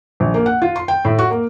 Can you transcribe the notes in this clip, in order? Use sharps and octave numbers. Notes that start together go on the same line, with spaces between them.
A#1
A#3
F#5
F4
C6
G5
A2
F#4
A#3